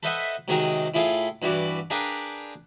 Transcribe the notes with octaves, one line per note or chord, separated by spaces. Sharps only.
A4 B4 C5 D#5 E5 F#5
C3 D#3 F#3 G#3 G#4 A#4
A2 E4 F4 G#4 A4 F5
G2 E3 E4 F#4 D5
D4 G#4 A#4 B4 F5 G5